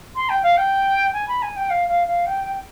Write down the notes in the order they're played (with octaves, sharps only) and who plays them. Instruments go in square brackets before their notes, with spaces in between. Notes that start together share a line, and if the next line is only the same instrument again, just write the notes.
[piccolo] C6
G5
F5
G5
G#5
B5
G#5
G5
F5
F5
F5
G5
G5